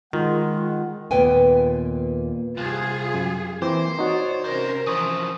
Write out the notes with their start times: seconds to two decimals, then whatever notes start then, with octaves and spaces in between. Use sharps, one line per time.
0.13 D#3 G#3 F4 F#5
1.11 D#2 A#2 B3 B4 G5 G#5
2.57 C2 F4 G#4
3.14 F#2
3.62 E3 A#3 C4 C5 D6
3.99 D#4 F#4 C#5 D5
4.44 C2 C3 C#4 A#4 C5
4.87 E3 F3 C5 C#6 D#6